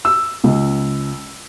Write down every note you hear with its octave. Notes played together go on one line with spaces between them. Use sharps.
E6
C#2